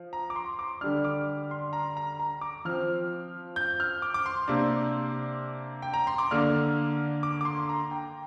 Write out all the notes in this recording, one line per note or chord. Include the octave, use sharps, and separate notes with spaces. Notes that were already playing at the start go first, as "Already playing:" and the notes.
Already playing: F3
A#5
D6
C6
D6
D3 G3 D4 F6
D6
C6
A#5
A#5
A#5
D6
F3 C4 F6
G6
F6
D6
D6
C6
C3 A#3 D4
G5
A#5
C6
D6
D3 A#3 D4 F6
D6
D6
C6
A#5
G5